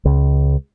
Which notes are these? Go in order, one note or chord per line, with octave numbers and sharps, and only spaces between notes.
C#2